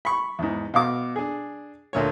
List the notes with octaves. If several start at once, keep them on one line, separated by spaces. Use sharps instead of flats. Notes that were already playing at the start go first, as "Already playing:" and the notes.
B5 C#6
E2 G#2
B2 F5 D6
D4 G#4
D2 A#2 C#5